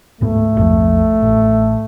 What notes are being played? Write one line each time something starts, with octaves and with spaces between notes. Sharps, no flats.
D1 G#2 A3 B3
B1 F2 F3
A1